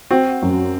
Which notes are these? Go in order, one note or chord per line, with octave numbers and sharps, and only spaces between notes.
C4 F#4
F#2